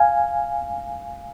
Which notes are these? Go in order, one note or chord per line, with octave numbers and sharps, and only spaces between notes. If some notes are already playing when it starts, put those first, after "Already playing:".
Already playing: F5 G#5